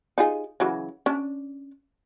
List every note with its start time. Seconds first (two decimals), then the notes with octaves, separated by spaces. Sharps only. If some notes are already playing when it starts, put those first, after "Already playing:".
0.18 D#4 F4 G#4
0.60 C#3 E3 F#3
1.06 C#4 D4